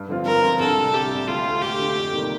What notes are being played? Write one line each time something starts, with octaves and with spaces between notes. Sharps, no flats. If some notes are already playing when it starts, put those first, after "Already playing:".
Already playing: G2
D3 F3 C4 F4
G2 A#4
D3 F3 C4 F4
C2 A4
C3 G3
C2 G4
C3 G3
D2 F4
D3 A3
D2 G4
D3 A3
F2
C3 D#3 G3 A#3